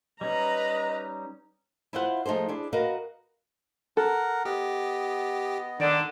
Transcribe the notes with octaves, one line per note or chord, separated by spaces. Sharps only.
G3 C#4 D#4 B4 D#5 A#5
E4 F4 B4 C5 E5 F#5
F3 A3 D#4 G#4 C5
D4 E4 G#4
F#4 A#4 B4 D#5 F5
A4 A#4 F#5
B3 G4 D#5
D3 D#3 D4